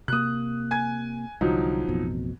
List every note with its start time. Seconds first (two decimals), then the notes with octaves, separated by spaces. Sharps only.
0.08 C3 A#3 D#6 F#6
0.71 G#5 G#6
1.41 C2 D3 F3 F#3 D#4
1.88 A1 F2 B2